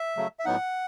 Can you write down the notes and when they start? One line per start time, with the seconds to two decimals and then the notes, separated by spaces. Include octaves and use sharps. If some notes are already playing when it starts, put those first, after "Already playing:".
Already playing: E5
0.16 C#3 F#3 A3
0.39 E5
0.45 A2 F#3 B3 D#4 F#5